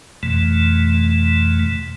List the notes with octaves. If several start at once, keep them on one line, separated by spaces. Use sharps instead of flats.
F2 B2 E3 A3